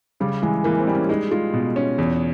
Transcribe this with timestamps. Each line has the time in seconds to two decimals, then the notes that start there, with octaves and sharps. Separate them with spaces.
0.20 C#3 G3
0.42 E3 G#3
0.64 E3 A#3
0.79 C4
0.87 G3
0.95 C#4
1.09 G#3 D#4
1.31 G#3 F4
1.53 B2
1.76 C#4
1.98 E2